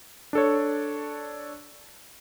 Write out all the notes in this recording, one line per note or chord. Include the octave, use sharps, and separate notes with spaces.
D4 A4 C#5